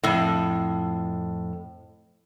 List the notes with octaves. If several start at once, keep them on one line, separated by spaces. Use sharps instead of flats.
F2 A2